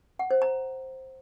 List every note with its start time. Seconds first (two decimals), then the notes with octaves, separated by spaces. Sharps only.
0.19 F#5
0.31 C5
0.42 A#5